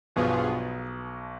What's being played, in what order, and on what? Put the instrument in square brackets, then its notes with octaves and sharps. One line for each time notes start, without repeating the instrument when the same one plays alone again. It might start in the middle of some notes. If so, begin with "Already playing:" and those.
[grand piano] B1 B2 [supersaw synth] G2 F3 B3 F4 G#4